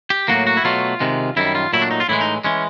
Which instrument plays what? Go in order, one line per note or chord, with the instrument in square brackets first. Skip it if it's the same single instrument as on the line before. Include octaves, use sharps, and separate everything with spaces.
[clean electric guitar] G4
A2 F#3 A#3 F#4
F#4
E4
B2 F#3 A3 F4
C3 D#3 G#3
F#2 D#3 G3 E4
F4
A#2 F#3 A3 E4
D4
D#4
F4
A2 E3 G#3 E4
D#4
E3 G#3 C#4